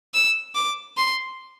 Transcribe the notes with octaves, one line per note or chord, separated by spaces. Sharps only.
E6
D6
C6